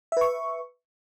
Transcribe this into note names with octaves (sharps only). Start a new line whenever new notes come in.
B4 E5 C#6